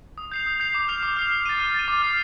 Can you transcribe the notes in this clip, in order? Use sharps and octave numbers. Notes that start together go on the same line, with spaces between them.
D#6
G6 C7 F7
D#6
G6 C7 F7
D6
F6 C7 F7
D6
F6 C7 F7
F6
A6 D#7
F6
A6 D#7
D6
F6 C7